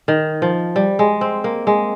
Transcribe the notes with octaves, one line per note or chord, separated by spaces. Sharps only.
D#3
F3
G3
G#3
C4
A#3
G#3